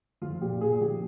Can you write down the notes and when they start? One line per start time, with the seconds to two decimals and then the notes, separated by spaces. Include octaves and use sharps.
0.22 F3 F4
0.41 A#2 G4
0.61 A#2 G#4
0.81 F3 G4